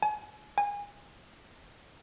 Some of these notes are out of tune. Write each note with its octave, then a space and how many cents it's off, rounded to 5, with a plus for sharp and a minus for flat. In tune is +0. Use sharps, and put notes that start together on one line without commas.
G#5 +35
G#5 -25